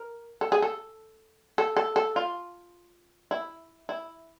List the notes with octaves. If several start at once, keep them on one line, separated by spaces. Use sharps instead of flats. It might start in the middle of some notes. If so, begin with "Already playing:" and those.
Already playing: A#4
A4
G#4
A4
A4
A4
A4
F4
E4
E4